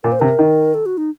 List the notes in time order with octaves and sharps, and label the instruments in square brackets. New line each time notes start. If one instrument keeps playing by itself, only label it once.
[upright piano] A#2 [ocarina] A#4
[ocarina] C5
[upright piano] C3 [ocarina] A#4
[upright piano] D#3
[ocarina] A4
F#4
D#4